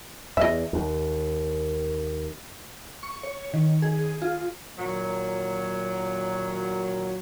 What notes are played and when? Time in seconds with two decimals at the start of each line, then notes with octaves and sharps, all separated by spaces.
0.37 E2 D#5 E5
0.73 D#2
3.03 C#6
3.23 C#5
3.54 D#3
3.82 G#4
4.22 F4
4.77 A#2 D#3 F#3